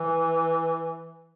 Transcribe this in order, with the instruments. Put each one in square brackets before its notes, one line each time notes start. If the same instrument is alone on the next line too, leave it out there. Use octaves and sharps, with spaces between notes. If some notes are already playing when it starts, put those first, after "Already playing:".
Already playing: [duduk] E3